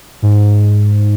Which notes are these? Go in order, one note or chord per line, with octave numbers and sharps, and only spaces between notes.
G#2